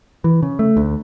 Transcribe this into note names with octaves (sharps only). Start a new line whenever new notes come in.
E3
C#3
A3
D2